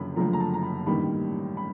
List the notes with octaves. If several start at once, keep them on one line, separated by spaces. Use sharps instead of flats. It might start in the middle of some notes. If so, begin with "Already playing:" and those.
Already playing: F#1 F#2 D3 F3 B5
F#1 F#2 D3 F3 A3 A#5
A#5
A5
A#5
B5
A1 G2 D#3 G3 A#3 B5
B5